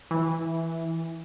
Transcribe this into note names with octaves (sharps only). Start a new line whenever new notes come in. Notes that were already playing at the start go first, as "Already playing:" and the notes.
E3